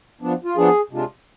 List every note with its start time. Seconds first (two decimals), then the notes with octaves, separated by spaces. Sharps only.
0.21 F3 B3 D4
0.44 F4
0.56 F3 B3 D4 G#4
0.91 C3 G#3 D4 F4